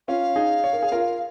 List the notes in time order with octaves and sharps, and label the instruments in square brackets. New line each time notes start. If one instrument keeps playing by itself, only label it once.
[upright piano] C#4 F4 [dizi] F5
[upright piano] D#4 G#4
C#5
A#4
G#4
F4 A#4